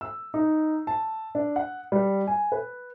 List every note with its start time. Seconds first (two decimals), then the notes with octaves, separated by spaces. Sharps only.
0.01 E6
0.34 D#4
0.87 A5
1.35 D4
1.56 F#5
1.92 G3
2.27 G#5
2.52 B4